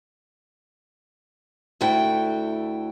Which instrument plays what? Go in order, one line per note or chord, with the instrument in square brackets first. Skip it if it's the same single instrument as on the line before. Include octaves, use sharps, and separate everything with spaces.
[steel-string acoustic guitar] D2 A3 E4 F#4 G5